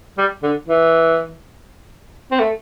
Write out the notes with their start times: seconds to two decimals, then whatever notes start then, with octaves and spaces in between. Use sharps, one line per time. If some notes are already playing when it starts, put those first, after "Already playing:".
0.18 G3
0.43 D3
0.69 E3
2.31 C4
2.40 A3